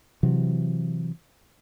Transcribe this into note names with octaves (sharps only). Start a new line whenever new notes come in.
C3 E3 F#3